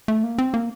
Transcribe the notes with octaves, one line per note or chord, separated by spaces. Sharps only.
A3
A#3
C4
A#3